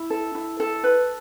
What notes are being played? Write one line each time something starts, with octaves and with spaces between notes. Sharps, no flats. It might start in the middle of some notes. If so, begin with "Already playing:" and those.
Already playing: E4
A4
E4
A4
B4